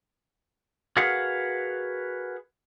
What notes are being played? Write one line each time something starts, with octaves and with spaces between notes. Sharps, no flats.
F#4 G#4 A#4 B4 F5 F#5